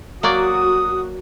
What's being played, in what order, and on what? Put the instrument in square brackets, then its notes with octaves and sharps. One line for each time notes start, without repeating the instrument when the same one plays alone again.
[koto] F#3 A#3 D5 [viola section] F#4 [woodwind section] D#6